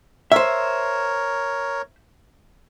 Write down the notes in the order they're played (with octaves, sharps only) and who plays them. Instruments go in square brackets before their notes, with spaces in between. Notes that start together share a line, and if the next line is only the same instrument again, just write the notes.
[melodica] A#4 C#5 [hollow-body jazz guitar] C5 E5